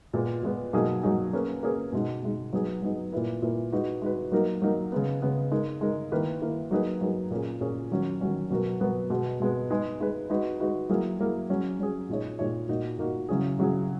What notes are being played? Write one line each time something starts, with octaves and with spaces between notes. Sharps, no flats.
A#2 G#3 B3
A#2 G#3 B3
B2 F#3 A#3 D#4 G#4
B2 F#3 A#3 D#4 G#4
A#3 C#4 G#4 B4
A#3 C#4 G#4 B4
B2 G#3 D#4
B2 G#3 D#4
F#3 B3 D#4 G#4
F#3 B3 D#4 G#4
A#2 A#3 E4 B4
A#2 A#3 E4 B4
G#3 D#4 F#4 B4
G#3 D#4 F#4 B4
F#3 A#3 D#4 A#4
F#3 A#3 D#4 A#4
C#3 G#3 B3
C#3 G#3 B3
G#3 D#4 A#4
G#3 D#4 A#4
D#3 A#3 E4 B4
D#3 A#3 E4 B4
F#3 A#3 D#4 G#4 B4
F#3 A#3 D#4 G#4 B4
A#2 A#3 C#4 G#4
A#2 A#3 C#4 G#4
D#3 F#3 C#4
D#3 F#3 C#4
B2 F#3 B3 F#4 A#4
B2 F#3 B3 F#4 A#4
B2 G#3 B3
B2 G#3 B3
G#3 D#4 G#4 B4
G#3 D#4 G#4 B4
G#3 D#4 F#4 B4
G#3 D#4 F#4 B4
F#3 A#3 E4 G#4
F#3 A#3 E4 G#4
F#3 C#4 G#4
F#3 C#4 G#4
A#2 G#3 D#4 G#4 C#5
A#2 G#3 D#4 G#4 C#5
A#2 A#3 D#4 F#4
A#2 A#3 D#4 F#4
C#3 F#3 C#4 E4 G#4
C#3 F#3 C#4 E4 G#4